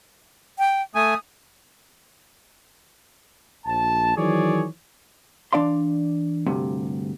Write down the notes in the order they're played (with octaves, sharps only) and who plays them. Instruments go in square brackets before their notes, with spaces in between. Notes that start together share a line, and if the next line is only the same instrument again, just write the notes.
[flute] G5
[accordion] A3 G#5 [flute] D#6
[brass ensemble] A#1 A5
D#3 E3 F#3 G#4 C#5 D5
[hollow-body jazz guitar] E3 D4 D5 F5 C6
D2 G2 C3